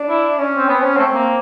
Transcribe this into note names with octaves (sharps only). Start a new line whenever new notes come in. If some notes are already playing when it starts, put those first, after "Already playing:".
Already playing: D4
E4
C#4
C4
B3 C4
C#4
A3 C4
A#3